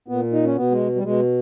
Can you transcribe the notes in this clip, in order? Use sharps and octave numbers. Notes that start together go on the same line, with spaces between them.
A#2 B3
D#4
C#4
B2 B3
G#3
G3
B2 G#3